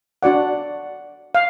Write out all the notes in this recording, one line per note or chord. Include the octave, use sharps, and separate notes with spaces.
D4 F#4 D5 F#5
F5